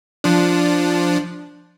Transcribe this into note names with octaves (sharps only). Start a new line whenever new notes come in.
F3 D4